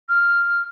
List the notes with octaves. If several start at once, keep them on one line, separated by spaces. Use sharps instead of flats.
F6